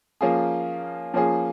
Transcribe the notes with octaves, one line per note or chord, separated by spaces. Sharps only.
F3 A#3 C#4 F4 G#4
F3 A#3 C#4 F4 G#4